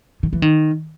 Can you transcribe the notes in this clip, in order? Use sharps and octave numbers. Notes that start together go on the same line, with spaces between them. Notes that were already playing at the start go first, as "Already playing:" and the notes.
D#3
E3
D#3